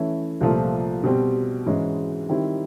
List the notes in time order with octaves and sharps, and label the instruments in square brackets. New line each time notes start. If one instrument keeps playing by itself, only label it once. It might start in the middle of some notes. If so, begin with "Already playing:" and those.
Already playing: [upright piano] E3 A3 C#4 E4
C2 A#2 F3 A3
B2 G3 C4
G#2 E3 G#3 C#4
D#3 G3 C4 E4